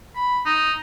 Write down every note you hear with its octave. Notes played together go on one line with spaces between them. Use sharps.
B5
D#4